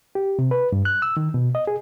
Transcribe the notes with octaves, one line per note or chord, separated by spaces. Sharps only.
G4
C3
B4
G2
F#6
E6
D#3
B2
D#5
G#4